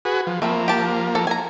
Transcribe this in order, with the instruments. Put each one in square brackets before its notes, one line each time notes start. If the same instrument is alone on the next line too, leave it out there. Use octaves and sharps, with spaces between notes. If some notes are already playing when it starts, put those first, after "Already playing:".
[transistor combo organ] F#4 G#4 B4
F3
[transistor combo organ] F3 A#3 [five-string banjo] A3 C4 B5
[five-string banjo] G4 A5
A4
G#5 A#5